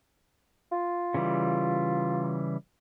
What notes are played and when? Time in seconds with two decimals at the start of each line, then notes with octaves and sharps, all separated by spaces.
0.72 F4
1.14 C#3 E3 G3